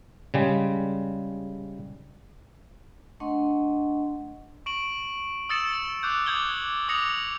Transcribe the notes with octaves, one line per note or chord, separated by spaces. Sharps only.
C#3 G3 G#3
A3 D4 D#5 F#5 C6 C#6
C#6 D7 F#7
D#6 E6 A6 C#7 E7
D6 F#6 G6
D6 D#6 G6 G#6 F#7 G7
D6 D#6 A#6 C#7 F7